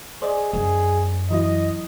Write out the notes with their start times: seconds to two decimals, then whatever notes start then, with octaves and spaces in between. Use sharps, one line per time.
0.22 G#4 C5 D5 D#5
0.53 F#2 G#4
1.31 E3 F#3 E4 D#5